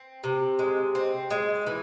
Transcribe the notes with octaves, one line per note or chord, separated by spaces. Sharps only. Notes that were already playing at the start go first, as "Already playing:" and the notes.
Already playing: C4
C3
G#3
C4
G#3
E3